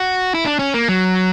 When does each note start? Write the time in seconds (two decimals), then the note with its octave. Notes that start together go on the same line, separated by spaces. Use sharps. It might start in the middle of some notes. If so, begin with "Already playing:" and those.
Already playing: F#4
0.34 E4
0.46 D4
0.59 C#4
0.74 A#3
0.89 F#3